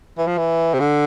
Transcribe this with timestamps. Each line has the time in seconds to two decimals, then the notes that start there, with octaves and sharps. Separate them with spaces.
0.18 E3
0.27 F3
0.37 E3
0.74 C3
0.80 D3